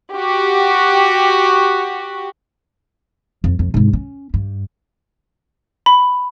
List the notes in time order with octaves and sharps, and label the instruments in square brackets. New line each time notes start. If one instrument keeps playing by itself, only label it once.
[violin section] F#4 G4
[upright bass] F2
F2
G#2 C3
C#4
G2
[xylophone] B5